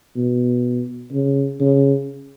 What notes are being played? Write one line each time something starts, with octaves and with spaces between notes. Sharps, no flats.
B2
C#3
C#3